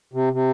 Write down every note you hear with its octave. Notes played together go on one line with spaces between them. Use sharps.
C3
C3